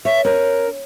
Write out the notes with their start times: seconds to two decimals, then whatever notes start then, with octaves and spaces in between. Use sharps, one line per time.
0.05 C#5 E5
0.25 C#4 A#4